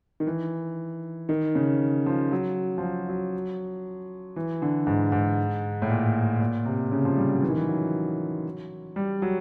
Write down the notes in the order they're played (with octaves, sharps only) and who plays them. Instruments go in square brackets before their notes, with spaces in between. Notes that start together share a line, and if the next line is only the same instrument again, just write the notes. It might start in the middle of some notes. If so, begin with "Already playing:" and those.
[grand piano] D#3
E3
D#3
C#3
F3
F#3
F3
F#3
F#3
E3
D3
G#2
G#2
A2
A#2
A#2
C3
C#3
F3
G3
F#3
E3
D#3
E3
F#3
G3
F#3